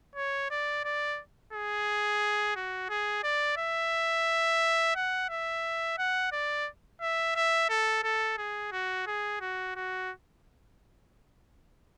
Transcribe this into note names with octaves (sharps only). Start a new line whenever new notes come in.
C#5
D5
D5
G#4
F#4
G#4
D5
E5
F#5
E5
F#5
D5
E5
E5
A4
A4
G#4
F#4
G#4
F#4
F#4